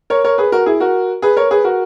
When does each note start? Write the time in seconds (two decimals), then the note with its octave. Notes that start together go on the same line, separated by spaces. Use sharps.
0.10 A#4 C#5
0.24 A#4 C#5
0.38 G#4 B4
0.52 F#4 A#4
0.66 E4 G#4
0.80 F#4 A#4
1.22 G#4 B4
1.37 A#4 C#5
1.51 G#4 B4
1.64 F#4 A#4